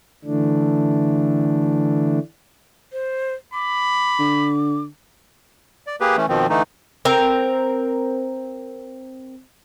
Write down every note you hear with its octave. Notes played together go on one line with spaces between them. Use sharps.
D3 E3 A3 D4
C5
B5 D6
D3
D5
A#3 G4 G#4 B4
E3 A3 C#4
B2 D#3 F3 C4
D3 E3 A3 D#4
C4 A#4